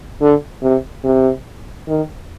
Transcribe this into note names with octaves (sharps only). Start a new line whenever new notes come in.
D3
C3
C3
D#3